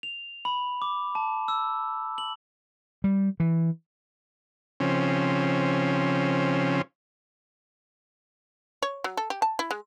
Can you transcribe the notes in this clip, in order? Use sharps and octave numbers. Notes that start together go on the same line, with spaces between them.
F7
B5
D6
A5
E6
F#7
G3
E3
C#3 F3 C4 C#4
C#5
F#3
A4
G4
A5
E4
G#3